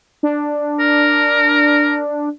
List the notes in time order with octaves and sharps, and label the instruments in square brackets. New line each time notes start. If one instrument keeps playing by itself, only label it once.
[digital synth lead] D4
[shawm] A#4